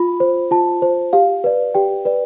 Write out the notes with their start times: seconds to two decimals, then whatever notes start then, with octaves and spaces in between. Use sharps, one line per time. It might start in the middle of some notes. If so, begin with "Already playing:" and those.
Already playing: F4 B5
0.20 C5
0.51 F4 A5
0.82 C5
1.13 G4 F5
1.44 B4 D5
1.74 G4 G5
2.05 B4 D5